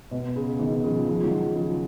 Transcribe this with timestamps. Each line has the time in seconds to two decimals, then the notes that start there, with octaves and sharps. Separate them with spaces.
0.11 B2
0.36 C#3
0.59 B2 D#3
0.84 C#3 F3
1.07 C#3 F3
1.24 D#3 F#3
1.55 C#3 F3